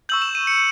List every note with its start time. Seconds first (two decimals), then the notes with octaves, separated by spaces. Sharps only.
0.09 C#6 E6 G6 F#7
0.22 E7
0.35 D#7
0.47 C#7